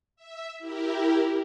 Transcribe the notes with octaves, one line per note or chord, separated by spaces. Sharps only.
E5
E4 G4 A#4